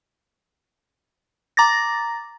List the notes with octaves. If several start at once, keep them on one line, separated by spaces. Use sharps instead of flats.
A#5 D6 A6 A#6